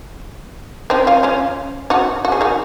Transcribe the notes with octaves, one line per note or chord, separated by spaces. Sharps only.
C4 D#4
C#4 F4
C#4 F4
D#4 F#4
F#4
G#4
D#4 F#4